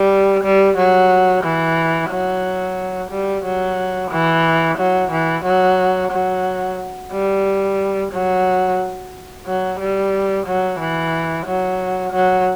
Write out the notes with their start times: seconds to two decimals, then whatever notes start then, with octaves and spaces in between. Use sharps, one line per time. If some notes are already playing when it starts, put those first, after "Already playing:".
Already playing: G3
0.43 G3
0.77 F#3
1.44 E3
2.10 F#3
3.11 G3
3.45 F#3
4.11 E3
4.78 F#3
5.11 E3
5.45 F#3
6.12 F#3
7.12 G3
8.12 F#3
9.46 F#3
9.80 G3
10.46 F#3
10.80 E3
11.46 F#3
12.13 F#3